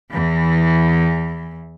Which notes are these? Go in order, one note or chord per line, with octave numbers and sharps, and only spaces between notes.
E2 E3